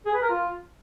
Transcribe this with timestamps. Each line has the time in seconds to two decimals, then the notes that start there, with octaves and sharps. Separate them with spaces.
0.06 G#4
0.14 B4
0.22 A#4
0.30 F4